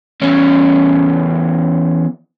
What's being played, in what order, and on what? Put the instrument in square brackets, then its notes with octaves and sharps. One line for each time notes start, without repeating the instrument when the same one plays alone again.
[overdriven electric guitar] E2 C#4